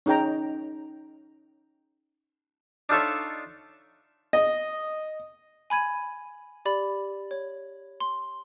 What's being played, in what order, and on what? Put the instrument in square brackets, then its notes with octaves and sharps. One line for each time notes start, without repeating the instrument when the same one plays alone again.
[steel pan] C#4 D#4 G#4 G5 A#5
[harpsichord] D4 D#4 F4 A4 C#5 E5
[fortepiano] D#5
[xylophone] G#5 B5 G#6 D#7
G4 D5 B5
C#5
C6